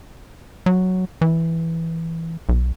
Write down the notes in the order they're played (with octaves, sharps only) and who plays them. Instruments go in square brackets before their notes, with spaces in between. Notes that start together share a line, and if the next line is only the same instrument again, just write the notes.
[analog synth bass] F#3
E3
B1